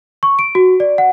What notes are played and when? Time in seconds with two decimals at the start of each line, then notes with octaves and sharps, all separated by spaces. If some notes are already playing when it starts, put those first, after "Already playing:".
0.23 C#6
0.39 D7
0.55 F#4
0.80 D5
0.98 F#5